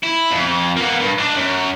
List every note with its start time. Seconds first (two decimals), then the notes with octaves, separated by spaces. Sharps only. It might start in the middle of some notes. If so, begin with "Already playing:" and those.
0.03 E4
0.31 F2
0.77 A#3 B3
1.00 G2
1.18 D4 D#5
1.35 F#2